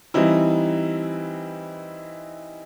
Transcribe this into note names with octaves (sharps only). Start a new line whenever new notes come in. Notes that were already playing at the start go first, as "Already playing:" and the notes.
E3 G3 C4 D#4 E4